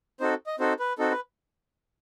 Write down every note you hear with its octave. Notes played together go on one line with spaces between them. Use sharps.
C4 D#4 F#4 A4 C5
D#5
C4 D#4 F#4 A4 C5
B4
C4 D#4 F#4 A4
B4